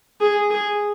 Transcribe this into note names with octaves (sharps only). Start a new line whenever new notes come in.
G#4
G#4